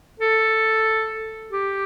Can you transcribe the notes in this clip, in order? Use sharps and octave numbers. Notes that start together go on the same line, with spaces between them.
A4
G4